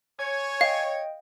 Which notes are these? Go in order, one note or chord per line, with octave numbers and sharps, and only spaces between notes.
C#5 G#5
D#5 F5 G5